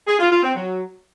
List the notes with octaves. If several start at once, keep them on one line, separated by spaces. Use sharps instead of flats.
G#4
F4
F4
C4
F#3